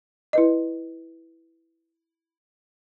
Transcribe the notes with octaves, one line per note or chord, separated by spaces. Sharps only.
E4 B4 D#5